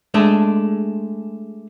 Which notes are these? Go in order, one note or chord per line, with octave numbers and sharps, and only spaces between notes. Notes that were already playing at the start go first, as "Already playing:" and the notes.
G#3 A3 D4